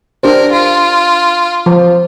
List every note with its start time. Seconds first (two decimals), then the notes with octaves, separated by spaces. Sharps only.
0.23 D4 G4 A#4 C5
0.52 F4
1.66 F3